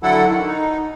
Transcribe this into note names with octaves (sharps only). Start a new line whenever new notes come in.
D3 F#3 E4 A4 F#5
D#3
D#4